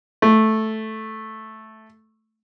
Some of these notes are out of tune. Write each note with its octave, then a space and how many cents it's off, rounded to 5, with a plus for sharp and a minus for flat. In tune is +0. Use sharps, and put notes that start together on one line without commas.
A3 -5